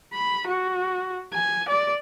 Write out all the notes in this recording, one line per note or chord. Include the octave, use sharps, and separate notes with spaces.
B5
F#4
G#5
D5